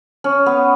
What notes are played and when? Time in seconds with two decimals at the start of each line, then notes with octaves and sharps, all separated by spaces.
0.24 C#4
0.46 B3